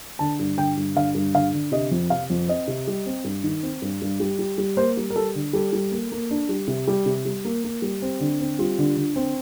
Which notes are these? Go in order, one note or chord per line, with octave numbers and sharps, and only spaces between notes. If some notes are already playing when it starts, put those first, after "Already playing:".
D3 A5
G2
D3 G5
G2
D3 F5
G2
D3 F5
D3
C3 D#5
F2
C3 F5
F2
C4 D#5
C3
G3
C4
G2
D#3
C4
G2
G2
G3
G3
G3
A#3 C5
G3
A#4
G3 A4
D3
G3 A4
G3
A#3
A#3
D4
G3
C3
G3
C3
G3
A#3
A#3
G3
C4
D3
C4
G3 F4
D3
D3
C4